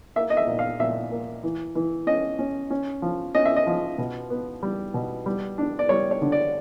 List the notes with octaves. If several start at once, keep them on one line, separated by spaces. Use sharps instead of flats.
A#3 E5
D#5
E5
A#2
F5
A#2 E5
A#3
E3
E3
C#4 D#5
C#4
C#4
F3
C#4 D#5
E5
D#5
F3
B2
B3
G3
B2
G3
D4
D5
G3 C#5
C#5
D3
D5